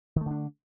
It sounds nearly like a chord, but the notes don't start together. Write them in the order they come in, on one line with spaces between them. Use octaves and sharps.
D#3 A3 D3 D4